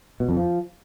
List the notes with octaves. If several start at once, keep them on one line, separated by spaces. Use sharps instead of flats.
B2
F2
F3